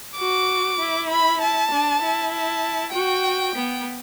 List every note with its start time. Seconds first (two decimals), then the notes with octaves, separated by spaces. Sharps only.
0.18 F#4 D6
0.79 E4
1.10 B5
1.41 A5
1.71 D4
2.02 E4
2.33 A5
2.93 F#4 G5
3.56 B3